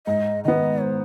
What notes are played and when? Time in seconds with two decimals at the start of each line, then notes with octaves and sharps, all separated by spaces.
0.06 G#2 D#5
0.44 D#3 B3 D#5
0.83 C5